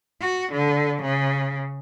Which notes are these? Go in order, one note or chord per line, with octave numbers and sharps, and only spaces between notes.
F#4
D3
C#3